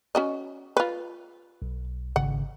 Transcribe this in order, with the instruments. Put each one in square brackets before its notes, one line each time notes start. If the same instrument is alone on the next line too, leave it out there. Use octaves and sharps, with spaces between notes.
[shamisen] C#4 F#4 D#5
F4 B4
[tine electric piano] B1
[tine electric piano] G#1 C#3 [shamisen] F#5